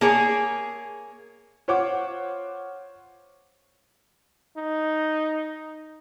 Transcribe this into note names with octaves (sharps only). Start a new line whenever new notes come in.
A#3 G#4 C#5
F4 C5 C#5 F#5 D6
D#4